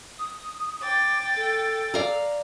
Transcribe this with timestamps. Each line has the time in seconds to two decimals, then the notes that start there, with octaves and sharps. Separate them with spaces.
0.19 D#6
0.82 G5 D6 A6
1.36 A4
1.94 D5 F5 A#5